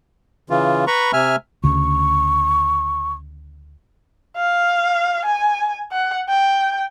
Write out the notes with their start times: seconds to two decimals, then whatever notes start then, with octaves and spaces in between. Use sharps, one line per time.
0.50 C#3 E3 F4
0.87 B4 A#5 B5 C#6
1.13 C3 E5 G#5 F6
1.64 D2 C#3 C#6
4.37 F5
5.25 G#5
5.91 F#5
6.29 G5